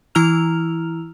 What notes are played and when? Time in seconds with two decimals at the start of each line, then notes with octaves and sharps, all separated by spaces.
0.15 E3 E4 A#5 E6 F6 F7